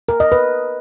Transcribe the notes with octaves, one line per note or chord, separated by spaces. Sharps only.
A#4
D#5
B4